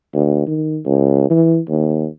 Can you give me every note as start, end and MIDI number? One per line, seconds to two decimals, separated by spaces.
0.14 0.45 38
0.47 0.79 51
0.85 1.26 37
1.30 1.59 52
1.69 2.07 39